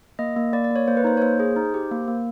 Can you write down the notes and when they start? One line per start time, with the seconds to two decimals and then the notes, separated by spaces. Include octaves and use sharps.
0.19 A#3 D#5
0.36 A#3
0.53 A#3 D5
0.64 D5
0.71 A#3 C#5
0.88 A#3 C5
0.97 B4
1.04 D#4 C5
1.17 C#5
1.22 A#3 C5
1.40 G#4
1.56 D#4
1.74 G4
1.91 A#3
2.08 A#3